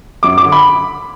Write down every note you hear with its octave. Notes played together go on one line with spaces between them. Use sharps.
F#2 D6
D6
D3
B5